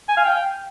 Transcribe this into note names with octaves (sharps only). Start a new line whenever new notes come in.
G#5
F5
G5